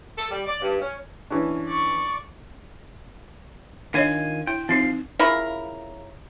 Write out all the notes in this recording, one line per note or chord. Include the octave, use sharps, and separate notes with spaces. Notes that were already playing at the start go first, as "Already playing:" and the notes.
A4
G3
D5
G2
C#4
E3 C#4 D4
D5 C#6
D#3 D4 F4 C#5 D#5 G#5
E4 G5
F3 C4 D#4 C6
C#3 E4 F4 A#4